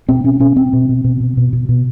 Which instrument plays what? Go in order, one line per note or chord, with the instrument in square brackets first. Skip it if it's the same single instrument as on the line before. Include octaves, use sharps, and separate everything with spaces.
[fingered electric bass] B2 C4
B2 C#4
B2 C#4
B2 C4
B2
B2
B2
B2
B2
B2
B2